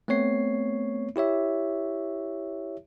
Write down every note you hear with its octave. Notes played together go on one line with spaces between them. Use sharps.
A3 B3 C4 C#5 C7
E4 G4 C#5 E5